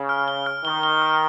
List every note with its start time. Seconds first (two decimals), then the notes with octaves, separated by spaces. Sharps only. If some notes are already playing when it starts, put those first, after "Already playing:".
Already playing: C#3
0.09 F6
0.28 G7
0.46 F6
0.64 D#3 G7
0.83 G7
1.02 F6